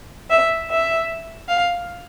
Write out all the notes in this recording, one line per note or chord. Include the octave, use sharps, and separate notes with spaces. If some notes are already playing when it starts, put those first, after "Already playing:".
E5
E5
F5